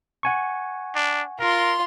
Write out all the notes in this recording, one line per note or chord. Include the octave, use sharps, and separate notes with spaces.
F#5 G#5 C#6
D4
F4 A#4 C6